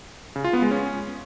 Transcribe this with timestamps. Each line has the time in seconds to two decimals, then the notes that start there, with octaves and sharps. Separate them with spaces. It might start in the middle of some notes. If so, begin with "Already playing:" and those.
0.36 C#3
0.44 F4
0.53 B3
0.62 G#3
0.71 C#4